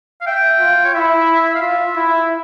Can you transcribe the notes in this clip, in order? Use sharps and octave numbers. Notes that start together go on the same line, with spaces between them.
F5
E5 G5
F4
C#5
E4 E5
F5
F4 E5
E4